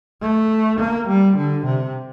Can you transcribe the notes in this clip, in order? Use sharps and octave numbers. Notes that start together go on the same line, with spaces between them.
A3
A#3
G3
D3
C3